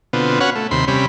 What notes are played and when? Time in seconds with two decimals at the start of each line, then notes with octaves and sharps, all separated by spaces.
0.13 B2 D3 B3 C4 F4
0.40 C#4 F#4 B4 C#5 F5 F#5
0.56 A3
0.71 D#2 C3 B5 C6
0.88 C3 G3 C#4 B5